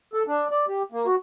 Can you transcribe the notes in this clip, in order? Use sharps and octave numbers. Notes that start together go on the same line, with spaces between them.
A4
D4
D5
G4
A#3
F#4